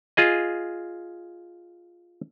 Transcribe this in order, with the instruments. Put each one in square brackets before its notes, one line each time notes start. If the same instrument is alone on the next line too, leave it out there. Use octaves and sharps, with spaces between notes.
[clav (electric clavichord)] F4 G#4 D#5